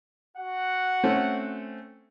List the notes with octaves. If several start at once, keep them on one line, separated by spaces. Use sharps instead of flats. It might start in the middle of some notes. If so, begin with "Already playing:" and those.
F#4 F#5
A3 C4 C#4